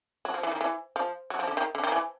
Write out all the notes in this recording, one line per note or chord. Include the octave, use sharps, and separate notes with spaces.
F#3
F3
E3
D#3
E3
F3
F#3
F3
D3
D#3
D3
D#3
E3